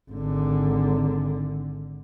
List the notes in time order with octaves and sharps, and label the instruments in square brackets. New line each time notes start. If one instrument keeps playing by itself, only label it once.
[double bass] G#1 D3